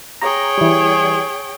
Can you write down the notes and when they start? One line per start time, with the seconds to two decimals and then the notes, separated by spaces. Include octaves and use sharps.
0.21 G#4 C#5 G5 A#5
0.58 E3 G3